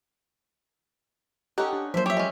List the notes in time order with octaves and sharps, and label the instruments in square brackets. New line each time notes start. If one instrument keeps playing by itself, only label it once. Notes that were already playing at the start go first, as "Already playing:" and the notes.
[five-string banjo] C#4 D#4 [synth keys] G4 A4 [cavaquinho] F#5
[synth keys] D4
[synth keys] F3 F#3 A#3 [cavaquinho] C5 E5
[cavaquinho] G4 E5 [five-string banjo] C#5
[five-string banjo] G#3 C#4